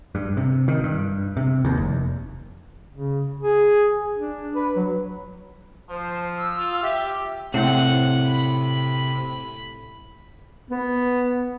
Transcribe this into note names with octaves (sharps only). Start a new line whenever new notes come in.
G2
C3
D#3
G2
C3
D#2
F1
C#3
G#4
D4
B4
F#3
F3 C5
E6
F4
G4 E5
A2 C3 C4 F#5
B5
B3